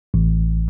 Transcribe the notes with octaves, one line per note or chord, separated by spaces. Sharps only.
A1